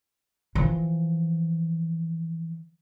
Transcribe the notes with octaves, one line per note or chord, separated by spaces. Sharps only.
E3 F3